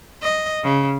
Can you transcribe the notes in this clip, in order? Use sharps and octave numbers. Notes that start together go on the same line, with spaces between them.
D#5
C#3